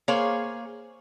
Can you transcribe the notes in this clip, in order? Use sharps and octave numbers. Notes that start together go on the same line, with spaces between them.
A#3 G#4 C5 C#5 F5